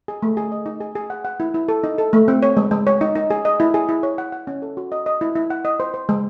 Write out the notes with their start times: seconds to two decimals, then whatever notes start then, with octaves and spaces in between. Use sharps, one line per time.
0.08 G#4
0.22 A3
0.37 G#4
0.52 D#5
0.66 D#4
0.80 G#4
0.95 G#4
1.10 F#5
1.25 F#5
1.40 E4
1.54 E4
1.68 A4
1.84 D#4
1.98 A4
2.13 A3
2.28 C4
2.43 C#5
2.57 G#3
2.71 G#3
2.87 C#5
3.01 D#4
3.15 D#4
3.30 G#4
3.45 D#5
3.60 E4
3.74 G#4
3.89 E4
4.03 C#5
4.18 F#5
4.32 F#5
4.47 C#4
4.62 A4
4.77 F#4
4.92 D#5
5.06 D#5
5.21 E4
5.35 E4
5.50 F#5
5.65 D#5
5.80 C5
5.94 C5
6.09 G#3